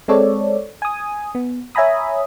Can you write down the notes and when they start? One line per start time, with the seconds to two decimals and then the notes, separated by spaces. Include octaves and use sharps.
0.08 G#3 C4 A4 C#5 D5
0.82 G#5 D#6
1.35 B3
1.75 C#5 E5 G#5 A#5 B5 D#6